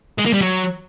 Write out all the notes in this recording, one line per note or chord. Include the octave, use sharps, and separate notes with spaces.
G#3
A#3
G3
F#3